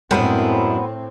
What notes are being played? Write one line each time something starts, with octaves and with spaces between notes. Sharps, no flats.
F#2 A2 G#3 B3 C4 D4 E4